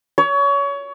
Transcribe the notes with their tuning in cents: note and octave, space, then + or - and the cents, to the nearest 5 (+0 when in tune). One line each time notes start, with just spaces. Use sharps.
C#5 +25